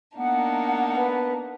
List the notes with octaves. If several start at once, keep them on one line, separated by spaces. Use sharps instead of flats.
A#3 B3 D4 D#4 F#5
B4